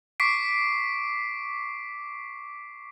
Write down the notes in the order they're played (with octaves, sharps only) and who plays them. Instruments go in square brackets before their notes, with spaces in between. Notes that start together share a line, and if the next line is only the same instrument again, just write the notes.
[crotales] C#6 D6 B6 C7 D7